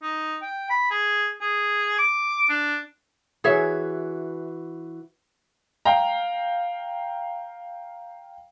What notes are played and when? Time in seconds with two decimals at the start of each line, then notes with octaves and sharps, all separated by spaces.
0.02 D#4
0.42 G5
0.70 B5
0.91 G#4
1.41 G#4
1.99 D6
2.49 D4
3.44 E3 F#4 G#4 C#5 E5
5.85 F5 G5 A#5